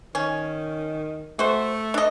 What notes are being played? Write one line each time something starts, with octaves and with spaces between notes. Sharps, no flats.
D#3 C#4
A3 F#4 C5
D4 D#5